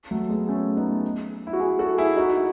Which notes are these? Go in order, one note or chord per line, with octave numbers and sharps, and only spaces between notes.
F#3 A3
G#3 B3
A3 C#4
B3 D#4
E4
F#4
E4 G#4
F#4 A4
E4 G#4
D#4 F#4
E4